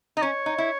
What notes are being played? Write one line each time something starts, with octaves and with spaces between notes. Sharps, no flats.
D#4 D#5
C#4 C#5
D#4
E4